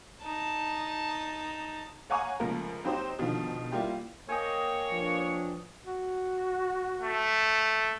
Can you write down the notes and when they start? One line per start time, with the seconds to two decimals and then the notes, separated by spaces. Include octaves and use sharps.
0.24 D#4 A5
2.10 C#5 F5 F#5 G#5 A#5 C#6
2.40 C#2 A2 F3 A#4
2.85 F#3 C4 D#4 G4 C5
3.19 B2 D3 D#3 F3
3.72 G3 A#3 E4 F4 G4
4.29 A#3 C#5 D#5 G5 G#5
4.92 F3 D4 B4
5.85 F#4
7.02 A3